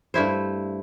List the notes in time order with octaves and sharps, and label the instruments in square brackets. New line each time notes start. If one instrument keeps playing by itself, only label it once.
[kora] G2 A3 E4 C5